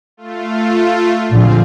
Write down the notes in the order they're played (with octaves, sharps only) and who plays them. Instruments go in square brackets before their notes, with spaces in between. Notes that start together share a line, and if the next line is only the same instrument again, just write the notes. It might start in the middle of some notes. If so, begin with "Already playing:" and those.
[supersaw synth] A3 F4
[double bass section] A#2 D3 F3 [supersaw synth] C4 G#4 F5